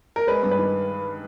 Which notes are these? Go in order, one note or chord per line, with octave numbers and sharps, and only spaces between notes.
A#4
G#3 B4
G2
B4
D#3